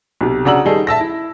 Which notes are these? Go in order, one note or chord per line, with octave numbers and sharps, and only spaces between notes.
B1 C3
C#3 D4 F#4 A#5 E6 F#7
D#3 G3 D#4 G#4 A4
E5 A5 E6 A#6
E4